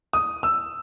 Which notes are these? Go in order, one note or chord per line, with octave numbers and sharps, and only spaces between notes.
D#6
E6